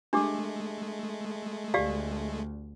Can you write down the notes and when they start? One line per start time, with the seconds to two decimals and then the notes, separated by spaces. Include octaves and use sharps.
0.13 G#3 A3 D4 G4 D6
1.74 D2 G4 D5 F5